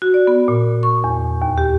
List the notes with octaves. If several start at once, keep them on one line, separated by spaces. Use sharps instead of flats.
F#4
D5
B3
A#2
C#6
E2
D#2
G4